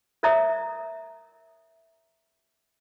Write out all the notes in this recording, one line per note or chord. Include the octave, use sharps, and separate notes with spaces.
A#4 C#5 D5 E5 A#5 D#6